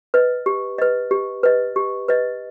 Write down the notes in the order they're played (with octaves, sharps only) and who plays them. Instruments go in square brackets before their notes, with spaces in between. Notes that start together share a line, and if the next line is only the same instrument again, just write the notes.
[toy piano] B4 D#5
G4
B4 D#5
G4
B4 D#5
G4
B4 D#5